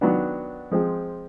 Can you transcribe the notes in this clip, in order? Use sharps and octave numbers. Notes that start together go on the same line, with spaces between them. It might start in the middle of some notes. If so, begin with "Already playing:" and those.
D#3 F#3 B3 D4
F3 G#3 C4